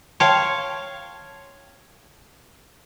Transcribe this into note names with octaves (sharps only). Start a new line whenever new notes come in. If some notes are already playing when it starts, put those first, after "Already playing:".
C#5 F5 G5 A5 C6